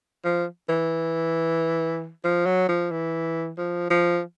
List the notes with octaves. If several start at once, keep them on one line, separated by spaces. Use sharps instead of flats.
F3
E3
F3
F#3
F3
E3
F3
F3